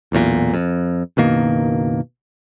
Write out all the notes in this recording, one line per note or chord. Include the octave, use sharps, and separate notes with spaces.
E1 B1 E2 A#2
F2
F#1 B2 D#3 A#3